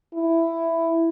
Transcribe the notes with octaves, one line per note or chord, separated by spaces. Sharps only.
E4